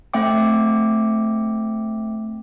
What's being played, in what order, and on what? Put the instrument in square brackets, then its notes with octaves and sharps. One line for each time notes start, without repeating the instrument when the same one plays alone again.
[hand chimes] A3 C4 E5 G5 D6